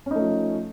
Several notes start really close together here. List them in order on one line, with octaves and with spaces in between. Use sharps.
C#4 D#4 A3 F3